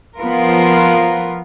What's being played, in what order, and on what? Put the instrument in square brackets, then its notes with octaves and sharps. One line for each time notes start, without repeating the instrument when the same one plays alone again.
[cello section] F3 B3 F4 A#4